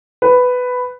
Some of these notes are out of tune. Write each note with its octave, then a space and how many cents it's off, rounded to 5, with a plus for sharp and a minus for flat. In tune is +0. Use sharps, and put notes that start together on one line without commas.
B4 +10